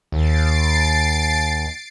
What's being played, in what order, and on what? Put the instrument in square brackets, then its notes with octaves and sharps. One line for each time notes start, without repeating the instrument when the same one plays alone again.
[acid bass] D#2 [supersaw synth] A6 C7 D7